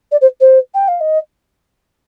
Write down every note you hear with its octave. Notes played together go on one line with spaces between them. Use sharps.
D5
C5
C5
G5
F5
D#5